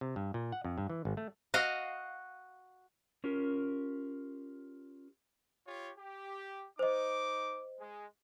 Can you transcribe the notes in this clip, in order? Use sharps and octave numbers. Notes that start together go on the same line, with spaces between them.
C3
G2
A#2
F#5
F2
G2
E3
G#1
A3
F#4 D#5 F5
C#4 F4 G4 A#4
F4 G4 C#5
G4
D#4 C5 D#5 D6
G#3